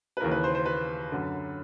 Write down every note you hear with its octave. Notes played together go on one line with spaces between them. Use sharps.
B4
D#2 C#3 E3 A#4
B4
C5
C5
B4
F#2 D3